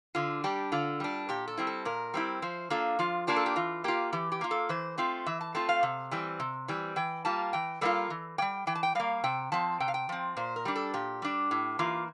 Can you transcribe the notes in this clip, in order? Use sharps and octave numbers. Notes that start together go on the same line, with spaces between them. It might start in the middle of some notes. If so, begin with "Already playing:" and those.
D3 F4
G3 D4 G4
D3 F4
G3 D4
A#2 G4
A4
G3 C4 E4
A4
A#2 A#4
G3 C4 E4
F3 C5
A#3 D4 F4 A4
F3 F4
A#3 D4 F4 G4
A4
G4
E3 F4
A#3 F4 G4
E3 G4
G4
A#3 F4
A4
E3 C5
A3 C4 F4
E3 E5
A5
A3 C4 F4 A5
F5
C3
E3 G3 C4
C3
E3 G3 C4
E3 G5
G3 A#3 F4 A5
E3 G5
G3 A#3 F4 A4
E3
G3 A#3 G5
E3 G5
A5
G5
G3 A#3 F5
C3 G5
F3 C4 A5
C3 G5
F5
G5
F3 C4
A#2 C5
A#4
G3 D4
A4
A#2 G4
G3 D4
A2
E3 A#3 F4